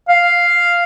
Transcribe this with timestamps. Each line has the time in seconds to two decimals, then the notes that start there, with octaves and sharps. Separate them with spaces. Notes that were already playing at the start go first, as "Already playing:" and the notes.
0.09 F5